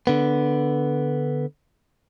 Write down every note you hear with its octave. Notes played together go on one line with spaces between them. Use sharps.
D3 B3